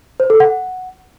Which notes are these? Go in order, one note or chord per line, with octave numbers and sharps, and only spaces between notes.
C5
A4
F#5